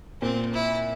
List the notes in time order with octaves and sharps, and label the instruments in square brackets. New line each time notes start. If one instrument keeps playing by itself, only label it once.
[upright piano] A#2 [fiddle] C4
[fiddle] E4